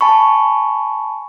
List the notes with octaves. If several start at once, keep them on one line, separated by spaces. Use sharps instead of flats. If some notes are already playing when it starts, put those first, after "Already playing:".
G#5 A5 B5 C#6